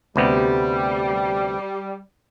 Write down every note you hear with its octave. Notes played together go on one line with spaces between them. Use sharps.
D2 C3 G3 B3